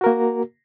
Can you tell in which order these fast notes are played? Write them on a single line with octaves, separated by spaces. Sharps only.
F#4 A#4 A#3